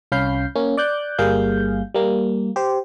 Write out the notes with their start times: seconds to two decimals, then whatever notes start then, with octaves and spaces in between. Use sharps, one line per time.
0.12 C2 C#4 F5 B5 G6 C7
0.55 A#3 C#4
0.77 D5 D6 F#6 G6
1.18 G1 G3 A#3 G#4 F5 G6
1.94 G3 A#3
2.56 G4 C5